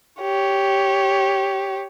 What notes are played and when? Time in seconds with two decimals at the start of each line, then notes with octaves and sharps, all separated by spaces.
0.21 G4 C#5